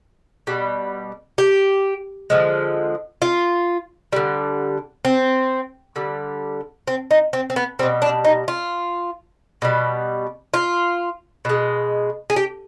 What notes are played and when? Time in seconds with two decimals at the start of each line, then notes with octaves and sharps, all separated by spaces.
0.47 B2 G3
1.38 G4
2.30 D3 F3 G#3
3.22 F4
4.13 D3 G3
5.05 C4
5.96 D3 G3
6.87 C4
7.11 D#4
7.33 C4
7.50 C4
7.56 B3
7.79 G3 C4
7.83 B2
8.02 D4
8.25 D#4
8.48 F4
9.62 B2 G3
10.54 F4
11.45 B2 G#3
12.30 G#4
12.36 G4